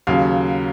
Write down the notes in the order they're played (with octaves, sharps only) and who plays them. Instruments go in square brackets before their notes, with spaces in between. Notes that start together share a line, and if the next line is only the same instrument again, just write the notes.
[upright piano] D#2 C#3 F#3 F5